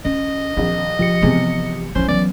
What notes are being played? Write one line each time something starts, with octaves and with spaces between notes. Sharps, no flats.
C#4 D#5
A#1 D#3 C4
C#3 F3 G4 C#7
C3 E3 G#3 B3
A#1 F3 C#4 E4 C5
E3 F#3 B3 D5